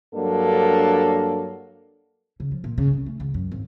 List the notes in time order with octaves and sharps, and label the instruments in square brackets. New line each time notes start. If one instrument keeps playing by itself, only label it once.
[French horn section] G2 F#3 A#3 D4 A4
[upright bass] C#3
F3
A#2
C#3
C2
A3
C#2
F#2
G#1